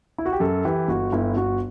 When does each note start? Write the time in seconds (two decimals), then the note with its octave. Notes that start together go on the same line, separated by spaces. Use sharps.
0.18 E4
0.26 F#4
0.33 G4
0.40 F#2 A4
0.65 E3 G4
0.88 G1 F#4
1.12 G1 E4
1.37 G1 F#4